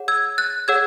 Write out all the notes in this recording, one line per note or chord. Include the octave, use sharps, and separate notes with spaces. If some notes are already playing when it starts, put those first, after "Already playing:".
Already playing: G#4 C#5 F#5
E6 G#6
F#6 A6
G#4 C#5 F#5 E6 G#6